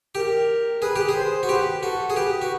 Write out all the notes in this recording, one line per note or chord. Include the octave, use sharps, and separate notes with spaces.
G4 A#4
G#4 B4
G4
G#4
C5
F#4
G4 B4
F#4 A4
G#4
G4 B4
F#4